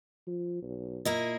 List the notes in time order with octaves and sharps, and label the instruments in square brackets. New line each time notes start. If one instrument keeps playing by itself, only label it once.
[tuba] F3
B1
[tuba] A#2 [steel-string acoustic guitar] A#3 E4 D#5